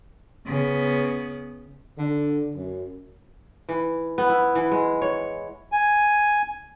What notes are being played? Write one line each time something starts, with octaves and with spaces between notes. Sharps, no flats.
C#3 B3
D3
F#2
E3
B3
E4
E3
G#3
C#5
G#5